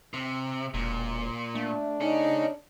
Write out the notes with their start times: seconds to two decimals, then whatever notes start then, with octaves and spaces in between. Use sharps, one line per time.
0.14 C3
0.74 E1 A#2
1.55 A3 D4
2.01 C#4 D#4 G#4